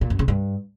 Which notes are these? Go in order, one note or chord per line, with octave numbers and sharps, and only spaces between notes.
A#2
F#2
C#3
G2